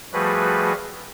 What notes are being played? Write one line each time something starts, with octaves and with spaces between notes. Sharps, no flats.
F3 G3 A3 F#4 G#4 B4